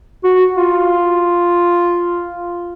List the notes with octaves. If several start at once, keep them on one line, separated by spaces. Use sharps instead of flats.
F#4
F4